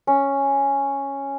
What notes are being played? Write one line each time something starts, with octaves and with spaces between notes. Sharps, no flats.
C#4